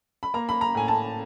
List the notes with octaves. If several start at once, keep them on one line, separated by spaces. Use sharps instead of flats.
B5
A#3 A#5
B5
A#5
A2 G#5
A5